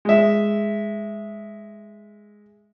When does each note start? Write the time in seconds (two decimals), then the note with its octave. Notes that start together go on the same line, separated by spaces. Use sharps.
0.05 G#3 E5